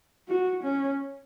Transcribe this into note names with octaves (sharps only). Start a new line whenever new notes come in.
F#4
C#4